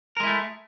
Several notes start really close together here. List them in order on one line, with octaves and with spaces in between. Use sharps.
A#4 G#3 E4 A3